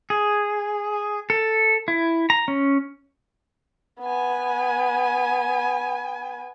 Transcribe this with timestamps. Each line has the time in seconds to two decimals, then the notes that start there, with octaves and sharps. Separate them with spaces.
0.10 G#4
1.30 A4
1.88 E4
2.30 A#5
2.48 C#4
4.01 B3 G#5